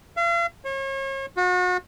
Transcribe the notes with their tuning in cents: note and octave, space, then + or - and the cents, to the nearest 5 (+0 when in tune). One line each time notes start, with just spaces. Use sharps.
F5 -40
C#5 -40
F#4 -35